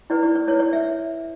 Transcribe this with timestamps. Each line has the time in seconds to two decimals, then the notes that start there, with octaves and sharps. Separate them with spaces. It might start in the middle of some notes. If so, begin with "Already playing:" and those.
0.10 E4 B4 D5
0.23 D5
0.35 D5
0.48 E4 B4 C#5
0.60 D5
0.73 E5